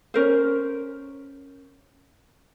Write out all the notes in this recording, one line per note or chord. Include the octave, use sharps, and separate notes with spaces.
C#4 A#4 C5